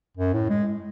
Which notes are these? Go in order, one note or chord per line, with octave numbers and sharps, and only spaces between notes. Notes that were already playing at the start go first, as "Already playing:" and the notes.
F#2
A2
G#3